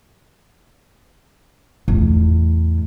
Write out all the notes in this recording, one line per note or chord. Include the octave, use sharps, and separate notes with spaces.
E2 A2